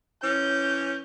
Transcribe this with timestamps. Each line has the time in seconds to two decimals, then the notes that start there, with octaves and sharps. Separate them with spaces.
0.23 E3 C#4 G6